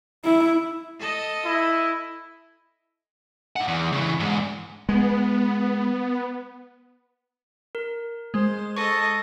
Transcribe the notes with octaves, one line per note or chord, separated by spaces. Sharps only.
E4
A4 D#5
E4
D#4 F#5
E2
C#3 E3
E2 G#2
G#3 B3
A#4
G#3 C5
A4 D#5 C#6